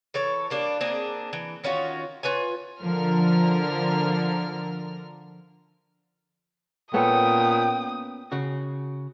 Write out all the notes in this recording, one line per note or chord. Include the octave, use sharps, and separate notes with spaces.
E3 A4 C#5
G3 A#3 D4
A#3 C4 D4 G#4
E3
D#3 C#4 F4 F#4
F4 B4 C#5 G#5
D3 F3 A#4 F6
A#2 B3 C#4 A4 G5 D#6
C#3 F#4